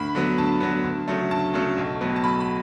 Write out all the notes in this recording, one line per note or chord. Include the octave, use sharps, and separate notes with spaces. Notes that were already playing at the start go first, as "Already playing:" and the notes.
Already playing: D2 B5
D3 F#3 B3
D2 A5
D3 F#3 B3
D2
C#3 F#3 A3
D2 A5
C#3 F#3 A3
B1
A2 F#3 B3
A5
B1 B5
B5